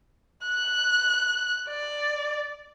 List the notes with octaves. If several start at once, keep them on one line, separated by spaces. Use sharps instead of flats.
F#6
D5